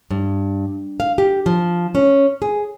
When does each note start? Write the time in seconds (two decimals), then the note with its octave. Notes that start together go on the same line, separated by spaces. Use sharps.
0.11 G2
1.00 F5
1.18 G4
1.46 F3
1.95 C#4
2.42 G#4